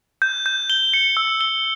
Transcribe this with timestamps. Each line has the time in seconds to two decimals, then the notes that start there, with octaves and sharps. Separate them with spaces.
0.22 G6
0.46 G6
0.70 G7
0.94 C#7
1.17 E6
1.41 G7